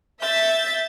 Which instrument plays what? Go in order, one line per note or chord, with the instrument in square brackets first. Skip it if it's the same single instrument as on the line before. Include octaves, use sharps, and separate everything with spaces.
[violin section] E5 [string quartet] G6 A6